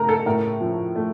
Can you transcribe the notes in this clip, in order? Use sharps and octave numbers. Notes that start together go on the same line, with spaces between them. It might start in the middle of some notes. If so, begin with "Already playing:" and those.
Already playing: C#3 A3 A#4 A#5
A4
A2 A#4
F3
A3